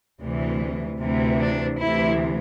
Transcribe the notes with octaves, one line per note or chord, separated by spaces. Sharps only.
D2 C3 E3
D2 C3 E3
D4
D2 C3 E3 E4